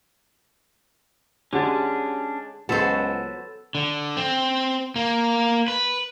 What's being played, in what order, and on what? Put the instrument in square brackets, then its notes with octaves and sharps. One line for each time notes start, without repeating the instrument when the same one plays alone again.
[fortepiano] D3 [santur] G#3 [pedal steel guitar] C#4 D4 [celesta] F#4 G4 F#5
[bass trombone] C#2 [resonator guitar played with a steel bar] F#3 C5 [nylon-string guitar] B3 [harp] A4
[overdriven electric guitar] D3
C4
A#3
B4